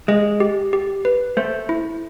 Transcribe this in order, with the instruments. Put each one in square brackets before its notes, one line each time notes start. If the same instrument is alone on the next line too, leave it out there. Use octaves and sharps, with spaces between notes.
[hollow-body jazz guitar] G#3 [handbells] D#5
[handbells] G4
G4
B4
[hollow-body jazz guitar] A3 [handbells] C5
[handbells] E4